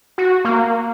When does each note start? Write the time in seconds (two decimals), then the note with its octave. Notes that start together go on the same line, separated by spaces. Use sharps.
0.18 F#4
0.45 A#3